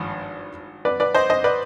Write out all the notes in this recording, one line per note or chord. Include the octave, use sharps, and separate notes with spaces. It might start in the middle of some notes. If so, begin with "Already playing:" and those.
Already playing: G#1 G2 F3
B4 D5
B4 D5
C5 D#5
C5 D#5
B4 D5